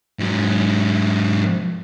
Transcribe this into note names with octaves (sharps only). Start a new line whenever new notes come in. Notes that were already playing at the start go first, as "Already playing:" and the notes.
G#2 F#3